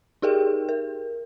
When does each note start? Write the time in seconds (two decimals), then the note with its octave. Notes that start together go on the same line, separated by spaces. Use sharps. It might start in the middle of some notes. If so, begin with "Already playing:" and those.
0.22 D#4 G4 G#4 A#4 G5
0.69 A#4